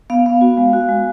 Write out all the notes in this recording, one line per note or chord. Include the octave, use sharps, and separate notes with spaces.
B3 F5
B3
F#4
G#3
F#4
G#3